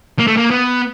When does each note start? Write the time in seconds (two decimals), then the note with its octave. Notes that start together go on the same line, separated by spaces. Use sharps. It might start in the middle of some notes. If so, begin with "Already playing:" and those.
0.19 A#3
0.27 A3
0.37 A#3
0.51 B3